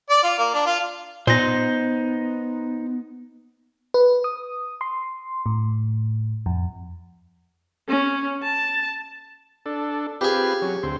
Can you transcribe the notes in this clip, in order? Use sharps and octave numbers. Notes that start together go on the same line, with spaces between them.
D5
F4
A#3
D4
F4
A#2 B3 D#4 C5 A#6
B4
D#6
C6
A2
F2
C#4
A5
D4 A4
C4 F4 G4 G#4 B4
F#3 C#4
D2 C4 C6